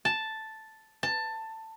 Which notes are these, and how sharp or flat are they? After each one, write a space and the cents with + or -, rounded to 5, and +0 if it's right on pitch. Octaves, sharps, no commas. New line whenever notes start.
A5 +0
A5 +15